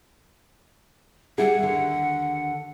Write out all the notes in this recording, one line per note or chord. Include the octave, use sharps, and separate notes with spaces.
G3 E4 G#4 F#5
D#2 D3